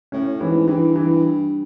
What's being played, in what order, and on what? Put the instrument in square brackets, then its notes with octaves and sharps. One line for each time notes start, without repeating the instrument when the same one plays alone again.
[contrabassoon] A2 [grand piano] C#4
[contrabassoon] G#2 [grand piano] E3
[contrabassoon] G2 [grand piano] E3
[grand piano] E3